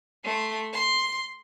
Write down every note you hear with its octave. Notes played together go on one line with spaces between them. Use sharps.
A3 C6
C6